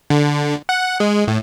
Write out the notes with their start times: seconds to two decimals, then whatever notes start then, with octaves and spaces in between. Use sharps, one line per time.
0.10 D3
0.69 F#5
1.00 G#3
1.27 A2